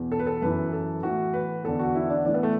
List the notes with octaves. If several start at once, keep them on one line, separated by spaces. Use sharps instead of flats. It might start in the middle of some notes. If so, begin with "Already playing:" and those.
Already playing: E2 B2
A4
B4
A4
F#2 E3 B4
A4
A2 E3 F#4
B4
E2 D3 A4
F#4
E4
D4
A2 E3 D4
B3
A3